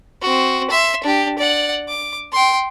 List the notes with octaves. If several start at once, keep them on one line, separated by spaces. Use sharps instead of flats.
C4 F#4
E5 C6
D4 G4
D5 F#5
D6
G5 C6